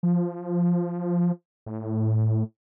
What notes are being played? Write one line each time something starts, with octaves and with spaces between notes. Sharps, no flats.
F3
A2